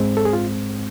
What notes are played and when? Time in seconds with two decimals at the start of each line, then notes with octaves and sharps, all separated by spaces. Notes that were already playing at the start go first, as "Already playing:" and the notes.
Already playing: G#2 G#3 C4
0.17 A4
0.25 G#4
0.33 F4